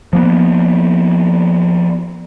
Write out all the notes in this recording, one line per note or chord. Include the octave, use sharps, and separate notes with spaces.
F3 A#3 B3